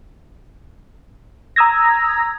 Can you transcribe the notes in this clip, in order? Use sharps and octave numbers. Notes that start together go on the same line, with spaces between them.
A#5 D#6 E6 G#6 A#6